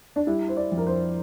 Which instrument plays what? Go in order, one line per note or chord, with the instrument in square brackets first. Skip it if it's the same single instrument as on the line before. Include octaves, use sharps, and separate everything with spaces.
[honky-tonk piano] D4
[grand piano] G3 [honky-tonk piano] E4
[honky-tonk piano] C5
D5
[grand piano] F2
[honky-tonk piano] A#4
C5